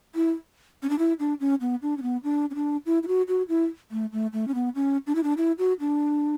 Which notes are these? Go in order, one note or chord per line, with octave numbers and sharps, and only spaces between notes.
E4
C#4
D4
E4
D4
C#4
B3
D4
C#4
B3
D4
C#4
D4
E4
E4
F#4
F#4
E4
A3
A3
A3
C#4
B3
C#4
D4
E4
D4
E4
F#4
D4